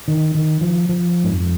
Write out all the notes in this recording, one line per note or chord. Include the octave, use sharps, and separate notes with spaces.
D#3
D#3
F3
F3
G#2
F2